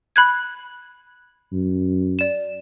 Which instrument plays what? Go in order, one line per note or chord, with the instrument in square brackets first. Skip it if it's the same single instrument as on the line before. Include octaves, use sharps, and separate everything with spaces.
[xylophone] B5 F#6 G#6
[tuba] F#2
[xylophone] D5 E7